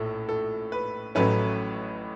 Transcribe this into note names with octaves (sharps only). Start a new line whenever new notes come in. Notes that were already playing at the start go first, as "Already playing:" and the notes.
Already playing: A#1 A2 A4
A4
B4
A1 A2 F#3 A3 C#4 B4